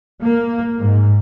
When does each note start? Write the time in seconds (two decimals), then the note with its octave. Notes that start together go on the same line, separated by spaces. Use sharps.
0.21 A#3
0.81 G#2